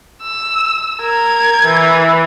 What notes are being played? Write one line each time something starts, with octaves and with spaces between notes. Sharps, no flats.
E6
A#4 G#6
E3